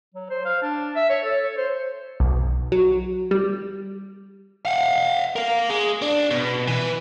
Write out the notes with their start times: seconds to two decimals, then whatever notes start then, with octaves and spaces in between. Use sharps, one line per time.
0.14 F#3
0.30 C5
0.46 F5
0.63 D4
0.96 E5
1.10 C#5
1.25 A4
1.43 C#5
1.57 C5
2.20 B1
2.72 F#3
3.31 G3
4.65 F5 F#5
5.36 A#4 F5
5.70 G#3
6.02 D4
6.31 B2
6.68 E3 B4